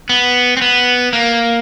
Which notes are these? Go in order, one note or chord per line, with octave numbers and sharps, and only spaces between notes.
B3
C4
B3
A#3